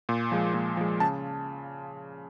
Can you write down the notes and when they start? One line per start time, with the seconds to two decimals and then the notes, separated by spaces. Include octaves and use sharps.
0.09 A#2
0.32 F3 G#3
0.54 A#2
0.77 F3 G#3
1.00 C#3 A5